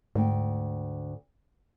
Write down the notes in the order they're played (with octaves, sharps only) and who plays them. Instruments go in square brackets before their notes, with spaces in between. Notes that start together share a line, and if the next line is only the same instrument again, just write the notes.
[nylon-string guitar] D2 G5 [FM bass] G#2